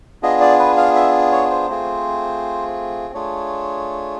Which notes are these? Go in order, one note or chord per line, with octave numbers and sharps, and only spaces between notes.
B3 D4 F4 G#4 D#5
D5
B4
F5
E5
C#5
C5
A3 C4 F4 G#4
A3 D4 F4 G#4 C#5